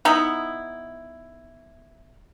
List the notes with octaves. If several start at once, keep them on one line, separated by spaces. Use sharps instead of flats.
B3 D#4 E4